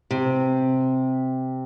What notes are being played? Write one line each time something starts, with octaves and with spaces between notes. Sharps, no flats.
C3